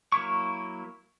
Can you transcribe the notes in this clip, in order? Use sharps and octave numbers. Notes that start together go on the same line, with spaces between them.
F#3 A#3 E4 C#6